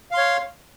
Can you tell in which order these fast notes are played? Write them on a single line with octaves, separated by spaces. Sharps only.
F5 C6 C#5